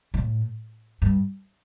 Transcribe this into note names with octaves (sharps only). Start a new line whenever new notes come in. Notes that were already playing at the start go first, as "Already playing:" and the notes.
A2
G2